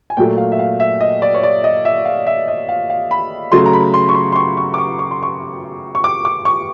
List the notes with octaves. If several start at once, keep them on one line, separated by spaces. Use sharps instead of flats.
G#5
A#2 F#3 A3 G5
F5
E5
F5
E5
D#5
D5
C#5
D5
D#5
E5
F5
E5
D#5
F5
F5
B5
C#3 F#3 A3 C6
A#5
B5
C6
C#6
C6
C6
C#6
C#6
D6
C#6
C#6
C6
C#6
C#6
D6
D6
C#6